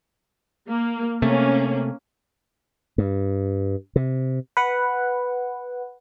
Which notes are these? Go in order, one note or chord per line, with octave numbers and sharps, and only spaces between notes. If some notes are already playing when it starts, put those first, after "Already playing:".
A#3
C3 A3 A#3 C#4
G2
C3
B4 F#5